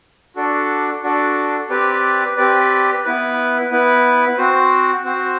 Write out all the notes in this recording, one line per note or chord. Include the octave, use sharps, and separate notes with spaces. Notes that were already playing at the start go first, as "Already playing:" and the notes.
D4 F#4 A4 D5
D4 F#4 A4 D5
C4 G4 B4 D5
C4 G4 B4 D5
B3 E4 B4
B3 E4 B4
C4 F#4 C5
C4 F#4 C5